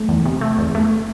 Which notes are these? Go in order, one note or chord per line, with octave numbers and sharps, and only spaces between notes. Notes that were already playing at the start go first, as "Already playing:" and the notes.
Already playing: A3
E2
C3
A3
E2
A3